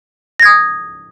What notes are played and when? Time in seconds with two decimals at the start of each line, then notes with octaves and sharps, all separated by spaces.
0.40 A#6
0.42 G#6
0.45 D#6